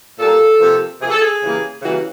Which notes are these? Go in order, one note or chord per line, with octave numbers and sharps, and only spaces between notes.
A#2 G3 A#3 A4
C3 F3 A#3
C3 F3 A#3 G#4
A4
G#4
C#3 E3 G3 A#3
C#3 E3 G3 A#3 F#4